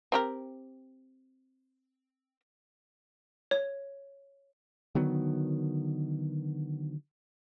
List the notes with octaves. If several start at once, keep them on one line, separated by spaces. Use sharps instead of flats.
C4 G4 A#4
C#5
D3 D#3 F#3 B3